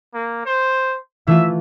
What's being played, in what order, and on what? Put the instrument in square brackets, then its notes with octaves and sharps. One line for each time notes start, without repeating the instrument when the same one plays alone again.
[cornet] A#3
C5
[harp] E3 A3 F4 [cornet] E5